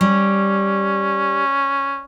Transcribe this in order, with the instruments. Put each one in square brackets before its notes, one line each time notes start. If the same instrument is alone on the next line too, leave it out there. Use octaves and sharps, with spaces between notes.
[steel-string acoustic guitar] G3 [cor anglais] C#4